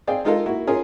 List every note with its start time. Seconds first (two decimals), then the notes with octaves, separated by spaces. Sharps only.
0.07 C4 G#4 D5 F5 G5
0.25 G#3 D#4 F4 A4 A#4 F5
0.46 A#3 E4 F#4
0.67 C#4 F4 G#4 A#4